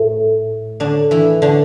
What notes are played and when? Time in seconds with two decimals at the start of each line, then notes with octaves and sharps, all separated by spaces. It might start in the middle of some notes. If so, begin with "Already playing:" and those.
Already playing: A2 A3
0.80 D3 D4
1.11 E3 E4
1.42 D3 D4